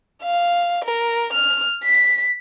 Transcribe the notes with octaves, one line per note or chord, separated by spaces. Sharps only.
F5
A#4
F6
B6